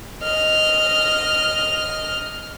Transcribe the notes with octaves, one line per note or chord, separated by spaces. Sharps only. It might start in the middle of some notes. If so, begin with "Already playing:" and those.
D#5 F6